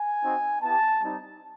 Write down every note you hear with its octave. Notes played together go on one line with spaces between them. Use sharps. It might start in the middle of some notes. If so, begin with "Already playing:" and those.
Already playing: G#5
C4 D#4 F#4
B3 E4 G4 A5
G3 C4 D#4